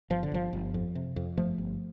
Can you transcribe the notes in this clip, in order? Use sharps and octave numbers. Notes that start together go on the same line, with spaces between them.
G1 F3
D3
G1 F3
G1
F2
C3
F2
G1 F3 A3
G1